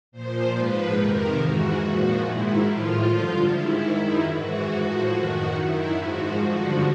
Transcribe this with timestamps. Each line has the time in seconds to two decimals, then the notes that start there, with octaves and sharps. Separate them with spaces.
0.12 A#2 F3 C5
0.54 G#2 F3 B4
0.95 F2 C3 D#3 A#4
1.37 G#2 E3 F#4
1.79 A#2 F3 F#4
2.21 G#2 D#3 E4
2.63 A2 F3 F4
3.04 G2 D3 F3
3.47 G#2 D#3 E4
3.88 F#2 D#3
4.30 G#2 E3 F#4
4.73 A2 F3 F#4
5.14 F#2 D#3 F#4
5.57 F#2 D#3 E4
5.98 G#2 F3 F#4
6.40 G2 D3 F3 F#4